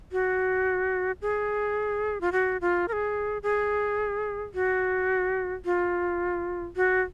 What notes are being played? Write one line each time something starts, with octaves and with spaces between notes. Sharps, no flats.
F#4
G#4
F4
F#4
F4
A#4
G#4
G#4
F#4
F4
F#4